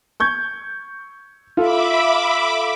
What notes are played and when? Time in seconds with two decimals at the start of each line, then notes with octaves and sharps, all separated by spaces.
0.20 C#6 G6 G#6
1.57 F4 A4 E5 B5 D6